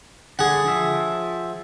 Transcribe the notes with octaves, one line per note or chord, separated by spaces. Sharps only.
D3 G#4 F#5
F3 E5